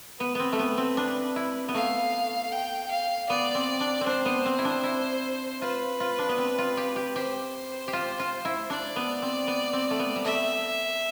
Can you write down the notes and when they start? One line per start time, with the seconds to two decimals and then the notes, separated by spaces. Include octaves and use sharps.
0.20 B3 B4
0.35 B3 C4
0.53 A3
0.59 B3
0.78 C4
0.97 D4
1.36 E4
1.68 B3
1.74 A3 F5
2.52 G5
2.91 F5
3.29 B3 D5
3.55 C4
3.80 D4
4.01 C4
4.06 D4 C5
4.26 B3
4.46 C4
4.58 E4
4.65 D4
4.83 E4
5.62 F4 B4
6.00 F4
6.19 D4
6.29 B3
6.38 C4
6.58 F4
6.77 G4
6.96 G4
7.16 G4 C5
7.88 G4
7.93 F4
8.19 F4
8.45 E4
8.70 D4 D5
8.96 B3
9.22 C4
9.47 B3
9.73 C4
9.90 A3
9.99 B3
10.16 G3
10.25 A3 E5